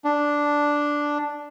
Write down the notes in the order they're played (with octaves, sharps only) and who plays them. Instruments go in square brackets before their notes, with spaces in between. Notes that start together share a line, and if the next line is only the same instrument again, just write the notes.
[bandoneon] D4